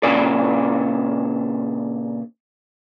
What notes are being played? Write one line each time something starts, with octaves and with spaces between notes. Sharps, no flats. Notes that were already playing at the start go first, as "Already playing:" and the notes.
A#2 C#3 D4 D5